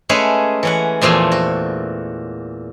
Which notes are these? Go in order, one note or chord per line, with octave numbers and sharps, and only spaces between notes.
G#3 A3 C#4 G#4 B4 C#5
E3 C#4 F#5
E2 A#2 F3 A3 G#5 C6
F#4